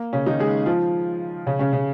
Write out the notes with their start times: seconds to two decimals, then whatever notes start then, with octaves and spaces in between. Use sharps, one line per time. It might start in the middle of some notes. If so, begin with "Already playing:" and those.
Already playing: A#3
0.13 C#3 C#4
0.26 D#3 D#4
0.40 G#3 G#4
0.66 F3 F4
1.47 C#3 C#4
1.59 C#3 C#4
1.73 C#3 C#4